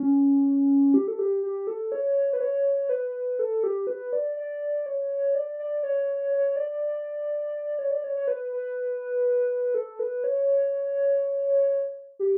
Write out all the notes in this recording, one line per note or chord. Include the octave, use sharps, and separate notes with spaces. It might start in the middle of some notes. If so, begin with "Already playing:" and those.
Already playing: C#4
G4
A4
G4
G4
A4
C#5
B4
C#5
B4
A4
G4
B4
D5
D5
C#5
D5
D5
C#5
C#5
D5
C#5
D5
C#5
C#5
B4
B4
A4
B4
C#5
G4